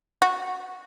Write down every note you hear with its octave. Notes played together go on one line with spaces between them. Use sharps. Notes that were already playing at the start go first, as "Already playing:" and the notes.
F#4